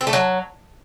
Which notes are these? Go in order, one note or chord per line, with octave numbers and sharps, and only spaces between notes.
C4
A3
F#3